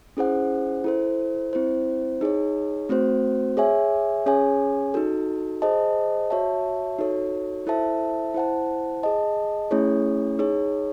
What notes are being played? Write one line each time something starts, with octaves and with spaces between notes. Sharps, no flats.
C#4 E4 G#4 C5 F#5
E4 A4 C5
C4 E4 C5
D#4 G#4 C#5
A3 C4 F#4 C5
G#4 C#5 E5 G#5
C#4 G#4 C#5 G#5
D#4 F#4 A4
G#4 C5 D#5 A5
F#4 C#5 E5 A5
D#4 F#4 A4 C#5
E4 A4 C5 E5 A5
E4 C5 F#5 A5
G#4 D#5 A5
A3 C#4 E4 G#4 C#5
D#4 G#4 C#5